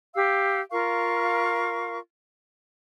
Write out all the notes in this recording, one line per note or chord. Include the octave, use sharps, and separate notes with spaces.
G4 F5 E6
F4 A#4 F5 C#6